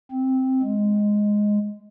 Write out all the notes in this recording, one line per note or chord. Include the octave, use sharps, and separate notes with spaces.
C4
G#3